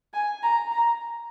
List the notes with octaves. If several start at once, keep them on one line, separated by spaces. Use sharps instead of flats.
G#5
A#5
A#5